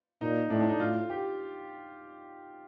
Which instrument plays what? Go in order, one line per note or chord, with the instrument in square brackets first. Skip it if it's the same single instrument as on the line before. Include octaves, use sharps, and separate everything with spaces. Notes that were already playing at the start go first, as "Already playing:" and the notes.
[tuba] A#2 [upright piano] D#4
[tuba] A2 [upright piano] D4
[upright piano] D4
D#4
[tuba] A2 [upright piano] F4
[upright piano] G4